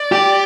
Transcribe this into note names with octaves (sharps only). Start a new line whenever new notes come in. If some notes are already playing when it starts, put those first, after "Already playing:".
Already playing: D5
G4